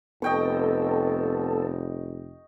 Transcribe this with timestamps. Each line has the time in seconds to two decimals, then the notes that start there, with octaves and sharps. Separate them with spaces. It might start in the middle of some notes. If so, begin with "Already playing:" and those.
0.22 F1 B3 A4 D#5 G5 C#6